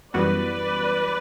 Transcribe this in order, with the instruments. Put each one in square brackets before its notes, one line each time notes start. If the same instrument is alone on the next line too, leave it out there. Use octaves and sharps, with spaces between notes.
[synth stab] F#2 E3 G3 B3 F#4 [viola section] B4 D5